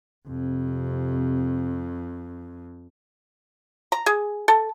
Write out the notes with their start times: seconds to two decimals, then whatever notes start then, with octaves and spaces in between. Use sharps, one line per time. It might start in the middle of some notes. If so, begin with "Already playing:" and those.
0.27 F2 C3
3.92 A#5
4.06 G#4
4.48 A4